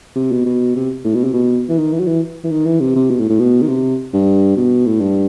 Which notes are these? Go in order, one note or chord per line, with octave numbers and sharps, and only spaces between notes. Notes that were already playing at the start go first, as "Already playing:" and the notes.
C3
B2
B2
C3
A2
B2
C3
B2
E3
D#3
E3
F#3
E3
E3
D#3
E3
C3
C3
B2
A2
A2
B2
D#3
C3
G2
B2
A2
G2